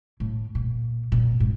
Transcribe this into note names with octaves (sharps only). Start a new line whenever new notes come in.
A2
A#2
A#2
G#2